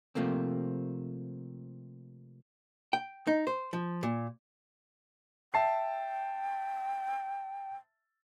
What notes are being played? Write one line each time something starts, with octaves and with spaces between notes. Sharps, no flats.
C3 F3 A3 A#3 C4
G5
D#4
C5
F3
A#2
E5 G5 A5 C7